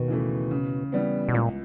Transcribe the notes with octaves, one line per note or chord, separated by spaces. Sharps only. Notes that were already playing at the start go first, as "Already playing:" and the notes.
Already playing: D#2 B2
C#3 E3 A3
C#3
E3 G3 B3
B2
C#2 A#2